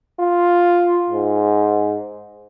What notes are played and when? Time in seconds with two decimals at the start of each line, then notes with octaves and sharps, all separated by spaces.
0.20 F4
1.10 G#2